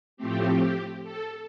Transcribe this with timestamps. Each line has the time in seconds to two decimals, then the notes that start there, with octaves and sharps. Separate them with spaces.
0.17 A2 F3 A3 C4 G4
1.03 A4